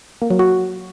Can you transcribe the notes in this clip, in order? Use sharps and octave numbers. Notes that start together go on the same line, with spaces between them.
A#3
F#3
F#4